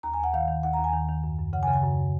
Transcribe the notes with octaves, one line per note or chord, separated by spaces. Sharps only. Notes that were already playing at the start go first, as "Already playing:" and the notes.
D#2 A#5
G#5
D#2 F#5
D#3 F5
D#3
D#2 F#5
A#5
D#2
G#5
D#3
D#3
F#2
F#2
C#3 F#5
G#5
C#3
G#5
F#2